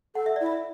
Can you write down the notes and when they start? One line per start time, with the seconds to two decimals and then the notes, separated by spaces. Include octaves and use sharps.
0.15 A4 F#5
0.26 E5
0.36 E4 D5
0.46 E5